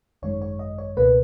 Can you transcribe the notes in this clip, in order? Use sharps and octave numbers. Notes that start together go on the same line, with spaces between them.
G#1 F#2 D#3 G#3 C#5
C#5
D#5
C#5
C#2 B2 A#3 B4